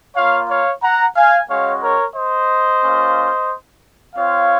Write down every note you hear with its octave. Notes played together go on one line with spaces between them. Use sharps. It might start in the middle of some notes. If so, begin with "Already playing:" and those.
A#3 F4 C#5 F5
C#5 F5
F#5 A#5
F5 G#5
G#3 C#4 F#4 C#5 F5
A#4 C#5
C5 D#5
A#3 C#4 F4
C4 F4 C#5 F5